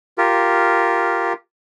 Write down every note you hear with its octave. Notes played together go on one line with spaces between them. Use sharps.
F4 G4 A#4